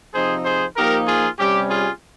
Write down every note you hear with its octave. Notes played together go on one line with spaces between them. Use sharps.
C3 F3 C4 D#4 G#4 C5
G#4 C5
F3 A#3 D#4 G4 A#4
F4 G#4
C3 G3 C#4 G4
F4 G#4